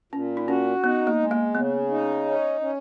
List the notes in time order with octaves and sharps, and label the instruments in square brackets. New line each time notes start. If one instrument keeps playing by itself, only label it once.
[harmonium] A#2 [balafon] C#4
[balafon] D#4
[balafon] C#4 [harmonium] F#4
[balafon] B3 [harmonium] D#4
[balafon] A#3
[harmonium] G#3
[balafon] A#3
[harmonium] C#3 [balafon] B3
[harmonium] D#4
C#4
C#4